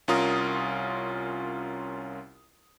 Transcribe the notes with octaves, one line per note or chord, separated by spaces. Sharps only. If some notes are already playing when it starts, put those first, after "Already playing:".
C2 C#4 F4 A#4 D#6